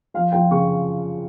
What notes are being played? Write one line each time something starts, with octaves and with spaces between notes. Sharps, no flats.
F3 F5
F3 G5
C#3 C#6